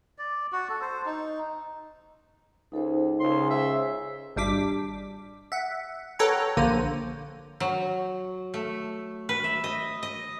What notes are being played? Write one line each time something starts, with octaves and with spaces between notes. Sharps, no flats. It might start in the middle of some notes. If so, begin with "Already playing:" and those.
D5
F#4
A4
C5
D#4
C#2 D#4 A4 C5
C#2 C#3 C6
C5 E5
G#1 G3 D4 D6 B6
E5 F#5
A4 B4 C#5 F#5 G5 A#5
A#1 D3 A#3 C5 D#7
F#3
A3
B4
E5
D#5
D#5